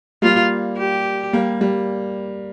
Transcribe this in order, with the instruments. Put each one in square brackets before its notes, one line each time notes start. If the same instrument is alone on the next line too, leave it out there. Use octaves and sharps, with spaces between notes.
[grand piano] G3 A#3 [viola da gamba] F4
[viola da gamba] G4
[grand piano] G3 A#3
G3